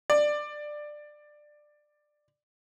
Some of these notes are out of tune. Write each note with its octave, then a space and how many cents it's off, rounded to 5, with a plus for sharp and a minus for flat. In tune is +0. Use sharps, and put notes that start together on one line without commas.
D5 +15